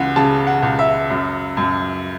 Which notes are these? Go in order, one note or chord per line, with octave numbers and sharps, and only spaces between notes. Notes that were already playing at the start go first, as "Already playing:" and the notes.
Already playing: C#2 E3 F#5
C#3 A5
F#5
C#2
E5
F#2
F#2